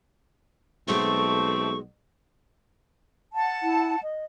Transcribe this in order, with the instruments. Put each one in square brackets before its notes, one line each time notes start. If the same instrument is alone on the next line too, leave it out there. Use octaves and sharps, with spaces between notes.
[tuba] B1 [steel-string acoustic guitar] G#3 F#4 [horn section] A3 C4 [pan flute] C#6
[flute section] F#5 A5
[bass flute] E4
D#5